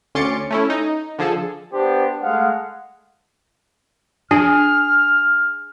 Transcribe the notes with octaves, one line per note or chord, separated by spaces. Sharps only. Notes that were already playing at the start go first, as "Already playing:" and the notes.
D2 C#4 C6 D6 A6 C#7
A3 C#4 E4
D#4
D3 F3 G#4 A4
B3 D4 G4 C5
G#3 A3 F5 F#5
D4 G#4 F6